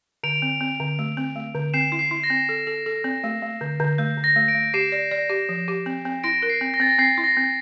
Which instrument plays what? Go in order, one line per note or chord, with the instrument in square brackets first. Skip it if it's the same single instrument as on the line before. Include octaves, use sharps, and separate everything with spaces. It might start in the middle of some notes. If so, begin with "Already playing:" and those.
[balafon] D3 [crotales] D7 F7
[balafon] C4
C4
D3
A3
C4
A3
D3
[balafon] C4 [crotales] C7 E7
[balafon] E4
[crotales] C7
[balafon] E4
[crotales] A#6
[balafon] C4
A4
A4
A4
C4
A3
A3
D3
D3
[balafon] A3 [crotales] G6
[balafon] D3
[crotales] A#6
[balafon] A3
[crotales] A#6 D7
[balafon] A3
[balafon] G4 [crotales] C7 E7
[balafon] D5
D5
G4
F3
G4
C4
C4
[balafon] E4 [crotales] A#6 D7
[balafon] A#4
[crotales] C7
[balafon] C4
[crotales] A#6
[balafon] C4 [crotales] A6
[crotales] A#6
[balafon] C4 [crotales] C7
[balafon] E4
[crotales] A#6
[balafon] C4